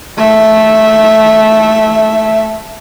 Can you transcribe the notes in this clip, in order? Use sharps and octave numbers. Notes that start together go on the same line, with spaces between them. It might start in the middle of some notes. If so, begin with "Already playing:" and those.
A3 E5